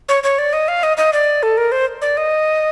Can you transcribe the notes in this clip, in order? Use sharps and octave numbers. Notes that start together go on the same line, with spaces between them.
C#5
C#5
D5
D#5
F5
D#5
D#5
D5
A4
A#4
C5
D5
D#5